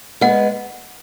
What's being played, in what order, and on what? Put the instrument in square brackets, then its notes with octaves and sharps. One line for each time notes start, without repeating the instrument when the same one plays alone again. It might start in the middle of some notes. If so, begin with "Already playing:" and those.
[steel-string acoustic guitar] G#3 B3 [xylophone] F#5